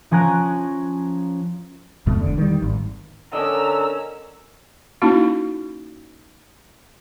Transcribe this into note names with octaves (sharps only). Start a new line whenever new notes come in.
F3 C#4 G#5 A#5 F#6 D7
C2 F2 B2 A3
E1 D3
D#3 G3
G#1
D3 C#4 A#4 D5 D#5 A#5 E6
A#3 C#4 D#4 E4 F#4